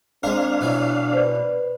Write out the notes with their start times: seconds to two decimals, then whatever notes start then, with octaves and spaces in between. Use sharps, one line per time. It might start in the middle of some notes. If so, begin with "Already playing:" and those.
0.23 G#3 C4 D4 A#4 F5
0.61 B2 E3 F#3 E4
1.13 B4 C5 D5